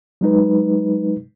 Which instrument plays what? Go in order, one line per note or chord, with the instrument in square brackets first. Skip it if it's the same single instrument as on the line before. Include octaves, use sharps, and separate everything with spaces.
[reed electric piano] F#3 G#3 D#4 B4